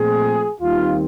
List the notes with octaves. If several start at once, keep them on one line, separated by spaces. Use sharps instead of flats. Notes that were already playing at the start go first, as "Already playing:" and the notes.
Already playing: A#2 F3 A3 C4 G#4
D#2 D#3 G3 C4 D#4 F4